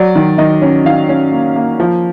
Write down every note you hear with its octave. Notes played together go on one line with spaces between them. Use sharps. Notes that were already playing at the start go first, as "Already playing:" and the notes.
Already playing: F#3 D5
D#3
D#3 D#5
C#4
D#3 F5
C#4
A#3
A#3
F3